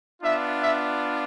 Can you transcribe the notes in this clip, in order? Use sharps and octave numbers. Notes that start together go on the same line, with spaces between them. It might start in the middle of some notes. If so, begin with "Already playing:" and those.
B3 D4 F4 E5
E5